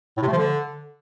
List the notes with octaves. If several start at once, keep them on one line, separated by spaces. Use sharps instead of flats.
A2
C3
A3
F3
D3